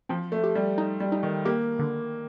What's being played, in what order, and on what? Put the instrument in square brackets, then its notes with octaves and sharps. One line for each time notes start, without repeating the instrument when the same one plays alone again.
[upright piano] F3 [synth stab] C4
[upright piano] A3
[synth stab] G4
[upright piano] G3
[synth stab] D#4
[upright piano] G3
[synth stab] D#4
[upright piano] D#3
[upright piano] A#3 [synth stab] G4
[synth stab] D3